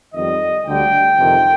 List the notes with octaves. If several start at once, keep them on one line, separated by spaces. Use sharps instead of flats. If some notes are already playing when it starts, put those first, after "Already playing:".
F2 D#3 G3 D#5
D2 D3 G3 G5
F2 C3 D#3